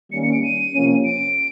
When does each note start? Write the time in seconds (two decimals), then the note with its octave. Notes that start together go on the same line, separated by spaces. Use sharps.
0.11 D#3 G3 A#3 C#4 C#7
0.23 C#7
0.32 D7
0.43 D#7
0.74 C3 F3 A#3 C#4
1.04 D7